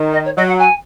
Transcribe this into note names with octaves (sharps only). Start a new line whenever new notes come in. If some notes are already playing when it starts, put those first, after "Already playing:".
Already playing: D#3
D#5
C#5
F#3 D#5
F#5
G#5